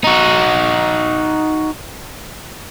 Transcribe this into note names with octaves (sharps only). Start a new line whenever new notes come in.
D#4 F#4